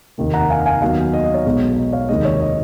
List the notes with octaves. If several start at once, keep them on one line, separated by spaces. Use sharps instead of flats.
F1 D#2 D#3 A#3
F#5 A#5
F5 G#5
F5 G#5
D#2 D#3 F#3 B3 F5 G#5
D#5
D#5
C#5
B1 B2 G#3 B3
D#5
C#5 F5
F1 D#2 D#3 G#3 D#5
C#5
D#5